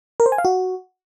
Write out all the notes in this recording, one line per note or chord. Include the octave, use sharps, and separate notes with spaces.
A#4
C5
G#5
F5
F#4